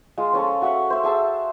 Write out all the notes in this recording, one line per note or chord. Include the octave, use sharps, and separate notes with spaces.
G#3 F4
F3 C#4 A4
F#4 E5 F#5
C5 E5
G#4 E5 A5 E6